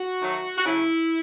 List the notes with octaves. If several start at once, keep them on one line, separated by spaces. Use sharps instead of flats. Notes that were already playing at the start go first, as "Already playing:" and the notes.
Already playing: F#4
D#3 F#3 A3
F#4
C#3 F#3 A3 E4